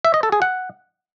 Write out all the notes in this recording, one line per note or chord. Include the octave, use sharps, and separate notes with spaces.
E5
D#5
A4
G#4
F#5